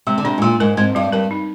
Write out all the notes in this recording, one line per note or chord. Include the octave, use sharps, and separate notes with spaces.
C3 G#3
D3
C3 D4
G#2
A#2 G#3
G#2 A#4
G#2 C4
G2 G3
G2 A#4
D#4